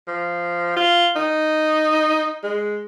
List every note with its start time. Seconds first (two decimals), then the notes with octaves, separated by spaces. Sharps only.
0.08 F3
0.77 F4
1.16 D#4
2.43 G#3